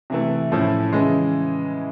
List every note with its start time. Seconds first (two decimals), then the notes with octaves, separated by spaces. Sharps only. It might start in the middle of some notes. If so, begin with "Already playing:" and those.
0.10 C3 E3 A3
0.52 A2 F3 A3 C#4 E4
0.93 C#3 E3 G#3